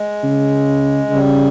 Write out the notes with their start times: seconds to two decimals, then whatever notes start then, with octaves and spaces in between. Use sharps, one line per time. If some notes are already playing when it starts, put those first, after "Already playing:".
Already playing: G#3
0.23 C#3
1.10 C#3 G3